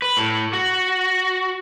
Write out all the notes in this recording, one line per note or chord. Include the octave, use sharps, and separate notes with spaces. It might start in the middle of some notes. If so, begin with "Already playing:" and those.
B4
A2
F#4